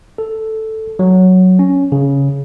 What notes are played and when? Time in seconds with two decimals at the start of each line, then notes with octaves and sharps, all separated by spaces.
0.18 A4
0.99 F#3
1.59 C#4
1.92 C#3